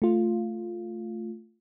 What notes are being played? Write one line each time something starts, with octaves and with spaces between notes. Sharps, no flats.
A3 F4